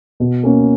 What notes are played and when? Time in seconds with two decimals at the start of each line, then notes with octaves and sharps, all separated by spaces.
0.20 B2
0.43 A#3 C#4